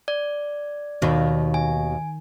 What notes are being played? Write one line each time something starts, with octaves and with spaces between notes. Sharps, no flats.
D5
D#2 B2 D#3
G#5